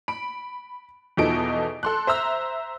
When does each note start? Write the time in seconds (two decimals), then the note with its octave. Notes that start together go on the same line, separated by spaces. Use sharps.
0.08 B5 D7
1.17 E2 B2 F3 D#4 A4 D7
1.83 A4 C6 F#6
2.07 C5 E5 A#5 E6